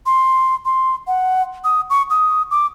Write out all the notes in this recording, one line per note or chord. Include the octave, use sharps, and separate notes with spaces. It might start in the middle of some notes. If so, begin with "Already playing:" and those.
C6
C6
F#5
D#6
C#6
D#6
D6